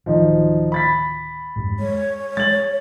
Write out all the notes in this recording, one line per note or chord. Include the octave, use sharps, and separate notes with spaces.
D1 D#3 F3 F#3 D#4
B5 A6 B6
F2 G#2
G#3 C#5
G#3 A6 F#7